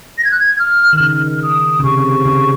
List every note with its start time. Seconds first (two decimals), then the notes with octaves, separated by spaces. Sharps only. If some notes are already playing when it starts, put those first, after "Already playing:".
0.18 A#6
0.24 G#6
0.31 F#6
0.40 G#6
0.59 F6
0.93 D#3
1.00 C#3 F6
1.42 D#6
1.79 C#3
1.83 C3 C#6
2.25 C#3